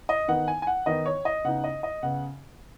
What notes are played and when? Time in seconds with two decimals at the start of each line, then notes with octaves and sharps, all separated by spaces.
0.09 D#5
0.28 D#3 B3 D#4 F#5
0.48 G#5
0.62 G#5
0.67 F#5
0.86 D#3 B3 D#4 D#5
1.06 C#5
1.25 D#5
1.44 C#3 B3 D#4 F#5
1.64 D#5
1.83 D#5
2.03 C#3 B3 F#5